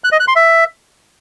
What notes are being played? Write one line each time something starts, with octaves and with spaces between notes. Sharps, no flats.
F#6
D#5
F#6
C6
E5